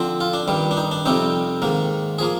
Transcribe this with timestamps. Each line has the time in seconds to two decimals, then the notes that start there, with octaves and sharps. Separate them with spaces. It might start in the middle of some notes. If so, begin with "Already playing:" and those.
Already playing: D3 F3 C4
0.20 F4
0.33 D4
0.48 G2 D#3 G3
0.71 D4
0.77 D#4
0.92 D4
1.05 F2 C3 G3 C4 D#4
1.62 G#2 D#3 A#3
2.19 F3 A#3 G#4